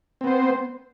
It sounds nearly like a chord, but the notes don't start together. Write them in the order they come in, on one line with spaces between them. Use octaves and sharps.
C4 B3 C5